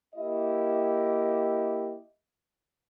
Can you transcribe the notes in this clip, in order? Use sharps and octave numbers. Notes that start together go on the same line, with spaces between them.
A#3 E4 G4 D#5